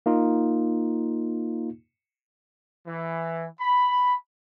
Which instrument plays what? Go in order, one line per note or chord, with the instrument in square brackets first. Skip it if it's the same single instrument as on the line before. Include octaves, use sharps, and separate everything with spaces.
[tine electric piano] A#3 D#4 F4
[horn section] E3
B5